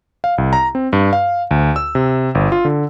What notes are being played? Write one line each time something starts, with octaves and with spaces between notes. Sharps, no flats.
F5
C2
A#5
C4
G2
F5
D2
E6
C3
G1
F4
D3